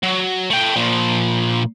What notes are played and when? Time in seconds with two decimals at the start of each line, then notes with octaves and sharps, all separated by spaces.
0.03 F#3
0.50 A3 G5
0.76 A#2 F3